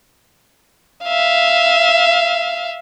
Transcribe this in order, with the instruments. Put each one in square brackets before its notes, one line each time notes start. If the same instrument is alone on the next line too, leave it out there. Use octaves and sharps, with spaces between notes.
[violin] E5 F5